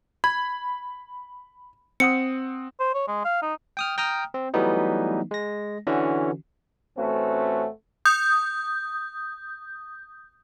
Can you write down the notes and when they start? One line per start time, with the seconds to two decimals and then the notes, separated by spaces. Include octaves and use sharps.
0.24 B5 G#6
2.00 C4 F#5 D#6 C#7
2.80 C5
2.94 C#5
3.08 G#3
3.24 F5
3.42 D#4
3.77 G5 D#6 F6
3.98 G5 A#5 D#6 F6
4.34 C4
4.54 E3 F#3 G3 A3 B3 D#4
5.31 G#3 A#6
5.87 D3 E3 C#4 F#4
6.97 A1 A3 C4 C#4 F#4 B4
8.05 D#6 G6